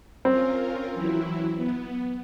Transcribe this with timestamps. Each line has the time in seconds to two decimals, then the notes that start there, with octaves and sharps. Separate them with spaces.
0.25 C4 C#4 F4 A#4
0.92 E3 F#3 E4
1.57 B3